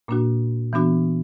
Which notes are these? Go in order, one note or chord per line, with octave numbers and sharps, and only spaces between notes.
A#2 A#3 D4 F#4
E3 B3 D4 F#4